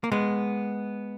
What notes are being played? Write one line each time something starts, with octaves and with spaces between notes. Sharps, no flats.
A#3
G#3 B3